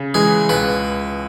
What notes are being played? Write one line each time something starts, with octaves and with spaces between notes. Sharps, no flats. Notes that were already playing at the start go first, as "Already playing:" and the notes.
Already playing: C#3
E3 G#3 G#4
C#2 B4